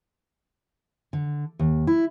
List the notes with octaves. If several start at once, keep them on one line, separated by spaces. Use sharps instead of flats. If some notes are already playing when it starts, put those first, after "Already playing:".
D3
D#2
E4